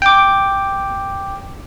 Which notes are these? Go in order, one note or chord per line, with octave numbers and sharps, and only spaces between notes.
G5 D6